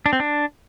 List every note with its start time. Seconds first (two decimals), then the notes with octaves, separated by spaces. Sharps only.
0.06 D4
0.13 C4
0.20 D4